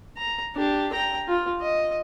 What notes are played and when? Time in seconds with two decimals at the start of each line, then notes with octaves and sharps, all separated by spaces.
0.17 A#5
0.55 D4 G4
0.93 G5 A#5
1.28 F4
1.61 D#5